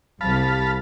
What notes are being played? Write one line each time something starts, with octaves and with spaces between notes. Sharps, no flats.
C2 F5 A5 B5